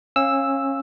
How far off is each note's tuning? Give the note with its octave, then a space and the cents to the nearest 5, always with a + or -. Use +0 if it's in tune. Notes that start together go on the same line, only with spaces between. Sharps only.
C#4 -25 F5 +0 E6 +0